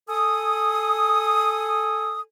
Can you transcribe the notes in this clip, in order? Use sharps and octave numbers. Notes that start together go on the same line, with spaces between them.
A4 G#5 D#6